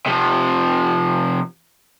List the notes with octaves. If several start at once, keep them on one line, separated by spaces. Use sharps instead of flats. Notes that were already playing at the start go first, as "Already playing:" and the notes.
C3 F3